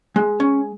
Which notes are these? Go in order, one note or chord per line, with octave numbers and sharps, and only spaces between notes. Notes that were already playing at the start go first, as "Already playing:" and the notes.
G#3
C#4